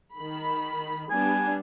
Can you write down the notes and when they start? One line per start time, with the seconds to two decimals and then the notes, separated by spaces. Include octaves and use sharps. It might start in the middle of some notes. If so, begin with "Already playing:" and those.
0.15 D#3 B5
1.10 G3 B3 D4 G#5